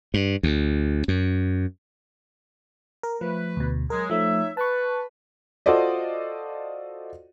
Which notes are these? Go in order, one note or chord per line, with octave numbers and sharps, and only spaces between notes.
G2
D2
F#2
A#4
F3 A3 B4
D2 B2
F#3 G#3 A#4
F3 A3 D#4 C#5 E5
B4 A5 C#6
F4 F#4 A4 C5 D5 D#5